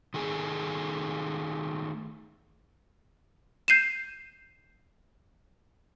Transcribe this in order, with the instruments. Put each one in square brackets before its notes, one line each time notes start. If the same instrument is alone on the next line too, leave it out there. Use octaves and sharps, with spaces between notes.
[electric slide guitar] D#3 A3 G#4
[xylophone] G6 C7 D#7 E7